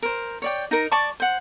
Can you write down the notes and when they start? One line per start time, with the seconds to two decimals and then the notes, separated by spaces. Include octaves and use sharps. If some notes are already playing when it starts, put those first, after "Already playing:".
0.02 A#4 C5
0.42 C#5 D5 G5
0.71 D#4 A#4
0.92 D5 A5 C#6 D6
1.20 C5 F#5